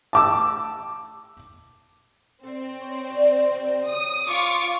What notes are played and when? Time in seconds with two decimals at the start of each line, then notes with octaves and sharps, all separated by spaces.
0.13 A5 D6 E6
2.43 C4 A4 C5 E5
2.81 C#5
3.10 F#4 D5 D#5
3.50 D#3 G3
3.87 C#3 F#3 D#6
4.27 C4 C#4 F4 A4 C#6 D6